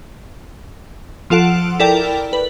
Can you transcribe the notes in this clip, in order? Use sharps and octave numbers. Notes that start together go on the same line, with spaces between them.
F3 F4 A4 F#5 D7
E4 A4 A#4 D5 G5
B4